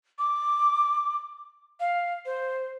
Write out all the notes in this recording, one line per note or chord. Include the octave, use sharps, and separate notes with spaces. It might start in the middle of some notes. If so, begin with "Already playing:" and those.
D6
F5
C5